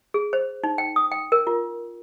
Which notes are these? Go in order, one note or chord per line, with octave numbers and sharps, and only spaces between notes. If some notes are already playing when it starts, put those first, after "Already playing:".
G#4
C5
D#4
G5
D#6
G5
A#4
F4